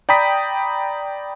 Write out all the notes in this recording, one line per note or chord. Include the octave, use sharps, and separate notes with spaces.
D5 G5 A#5 B5 D#6 B6